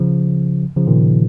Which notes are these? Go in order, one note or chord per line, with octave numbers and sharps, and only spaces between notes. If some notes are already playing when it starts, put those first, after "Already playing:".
Already playing: C#3 F3
C#3 F3
A#2 D#3